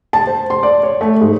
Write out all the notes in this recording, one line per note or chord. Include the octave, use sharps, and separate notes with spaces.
A5
C5
C6
D5
C#5
A3
G#2